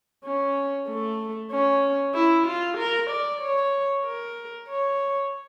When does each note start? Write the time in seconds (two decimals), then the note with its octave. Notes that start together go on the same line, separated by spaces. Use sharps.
0.24 C#4
0.88 A3
1.51 C#4
2.14 E4
2.47 F4
2.78 A#4
3.10 D5
3.42 C#5
4.05 A#4
4.69 C#5